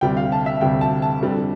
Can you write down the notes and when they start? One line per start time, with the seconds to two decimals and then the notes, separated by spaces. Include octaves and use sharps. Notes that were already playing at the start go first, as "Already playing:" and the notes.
0.01 D2 C3 G3 G5
0.17 F5
0.32 A5
0.46 E5
0.61 D2 C3 G3 G5
0.81 A5
1.02 A5
1.22 F2 D3 G3